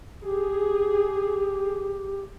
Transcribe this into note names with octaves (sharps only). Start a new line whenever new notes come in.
G4 G#4